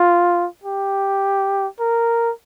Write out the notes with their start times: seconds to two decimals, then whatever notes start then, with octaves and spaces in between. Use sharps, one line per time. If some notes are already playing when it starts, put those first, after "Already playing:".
Already playing: F4
0.64 G4
1.80 A#4